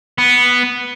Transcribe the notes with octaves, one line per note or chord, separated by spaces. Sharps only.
B3